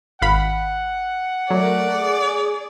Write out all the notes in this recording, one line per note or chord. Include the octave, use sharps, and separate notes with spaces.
G#1 F5 F#5 B5
F#3 A3 A#4 D5
G#4